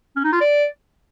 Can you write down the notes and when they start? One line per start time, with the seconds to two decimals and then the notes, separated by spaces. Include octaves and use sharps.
0.16 C#4
0.24 D#4
0.33 F4
0.41 D5